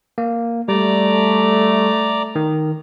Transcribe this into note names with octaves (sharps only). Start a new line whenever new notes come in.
A#3
G3 A3 D5 A#5 D6
D#3